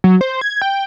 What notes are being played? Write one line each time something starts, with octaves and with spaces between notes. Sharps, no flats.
F#3
C5
G#6
G5